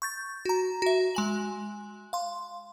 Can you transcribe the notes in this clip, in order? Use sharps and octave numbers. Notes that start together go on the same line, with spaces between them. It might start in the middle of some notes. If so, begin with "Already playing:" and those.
C#6 G6 A6
F#4 A#5
F#4 E5
G#3 G#5 F#7
F5 C6